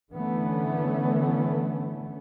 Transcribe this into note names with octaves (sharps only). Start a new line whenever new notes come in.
D3 E3 A3 B3 C#4